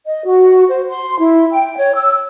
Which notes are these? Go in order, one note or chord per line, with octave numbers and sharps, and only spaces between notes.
D#5
F#4
C5
C6
E4
G5
C#5
E6